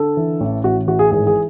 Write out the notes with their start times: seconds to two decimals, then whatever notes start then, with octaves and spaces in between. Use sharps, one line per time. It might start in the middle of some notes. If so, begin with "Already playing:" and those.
Already playing: D3 A4
0.17 E3
0.40 A1
0.64 A1 F#4
0.87 E3 F#4
0.99 G#4
1.11 G#1 G#4
1.27 G#4